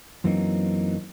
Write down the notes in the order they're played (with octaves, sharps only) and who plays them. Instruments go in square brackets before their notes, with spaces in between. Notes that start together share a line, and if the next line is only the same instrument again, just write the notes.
[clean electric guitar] F#2 E3 F#3 A#3 C4 D#4